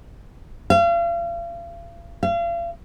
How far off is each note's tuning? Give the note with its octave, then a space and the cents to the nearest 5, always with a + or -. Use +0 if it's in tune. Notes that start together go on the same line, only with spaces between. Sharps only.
F5 -40
F5 -40